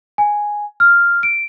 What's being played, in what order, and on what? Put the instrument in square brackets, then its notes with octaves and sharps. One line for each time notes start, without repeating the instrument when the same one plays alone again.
[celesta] G#5
F6
D7